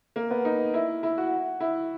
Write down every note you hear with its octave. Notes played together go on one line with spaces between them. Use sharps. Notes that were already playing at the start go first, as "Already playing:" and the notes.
A#3
B3
D#4
E4
E4
F#4
E4